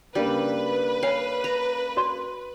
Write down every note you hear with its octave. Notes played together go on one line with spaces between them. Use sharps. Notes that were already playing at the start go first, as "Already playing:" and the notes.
C#3 G3 A#3 D4 B4
C#5 F5 G#5
A#5
F#4 D5 C6